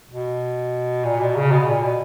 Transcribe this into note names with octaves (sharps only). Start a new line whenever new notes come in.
B2
A#2
B2
C#3
B2
A#2
B2